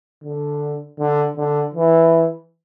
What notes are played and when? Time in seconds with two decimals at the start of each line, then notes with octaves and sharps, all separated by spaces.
0.24 D3
0.99 D3
1.37 D3
1.74 E3